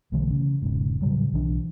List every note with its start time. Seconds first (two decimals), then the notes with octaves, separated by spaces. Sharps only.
0.12 B1 D3 E3 A3
0.30 C#3
0.62 E1 G#2 C#3
1.02 A2 C#3 F#3 G3
1.32 B1 E3 D4